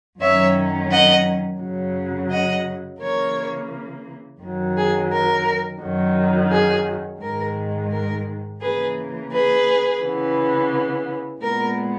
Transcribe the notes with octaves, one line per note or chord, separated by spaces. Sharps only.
F#2 D#3 F#3 C#4 C#5 E5
D#5 F#5
F#2 C#3 F#3
D#5 F#5
C#3 E3 A#3 A#4 C#5
F#2 D#3 F#3
G#4
A#4
F#2 D#3 F#3
G#4
G#2 D#3 G#3 A#4
A#4
C#3 E3 A#3 G#4 B4
G#4 B4
C#3 E3 B3
A#2 G#3 B3 A#4